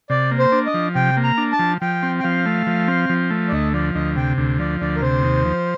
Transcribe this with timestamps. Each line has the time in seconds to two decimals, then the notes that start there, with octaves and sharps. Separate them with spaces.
0.10 C3 D5
0.31 A#3
0.39 C5
0.52 D4
0.66 D#5
0.74 F3
0.95 C3 G5
1.17 A#3
1.23 A#5
1.38 D4
1.53 A5
1.59 F3
1.81 F3 G5
2.03 C4
2.19 G5
2.23 F3 F5
2.46 A3
2.67 F3
2.88 C4
3.09 F3
3.30 A3
3.48 D5
3.52 D2 D#5
3.74 F3 D5
3.95 D2 D#5
4.16 C3 G5
4.38 D2
4.59 F3 D5
4.81 D2 D5
4.96 A#4
5.02 C3 C5
5.23 D#2
5.44 F3